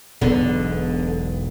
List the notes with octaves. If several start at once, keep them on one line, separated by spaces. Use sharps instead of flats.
E1 B1 D3 B3